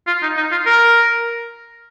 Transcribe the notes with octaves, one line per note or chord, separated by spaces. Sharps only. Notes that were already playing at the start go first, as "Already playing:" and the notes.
F4
D#4
D#4
F4
A#4